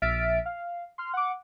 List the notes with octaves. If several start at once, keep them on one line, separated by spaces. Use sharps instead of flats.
A#1 E5 F6 A6 B6 D7
F5
C6 F6
F#5 D6